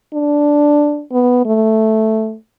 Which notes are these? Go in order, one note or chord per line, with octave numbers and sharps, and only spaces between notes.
D4
B3
A3